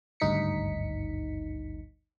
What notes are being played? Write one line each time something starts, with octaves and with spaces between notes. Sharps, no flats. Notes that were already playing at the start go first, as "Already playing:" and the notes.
G#1 D2 G2 D#4 B6 C#7